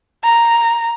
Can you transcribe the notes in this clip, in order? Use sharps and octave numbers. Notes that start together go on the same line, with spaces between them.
A#5